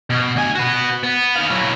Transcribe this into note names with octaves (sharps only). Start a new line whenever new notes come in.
B2
D2 G#5
F#4 B4
B3
D#4 F5
F#3 E4